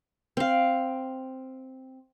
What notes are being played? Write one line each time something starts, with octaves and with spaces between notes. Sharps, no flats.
C4 F5